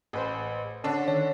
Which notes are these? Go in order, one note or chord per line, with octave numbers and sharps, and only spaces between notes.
A1 G#4 B4 C5
D3 C#4 D4 A4 F#5
D#3 C#5